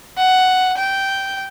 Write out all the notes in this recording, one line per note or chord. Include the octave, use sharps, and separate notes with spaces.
F#5
G5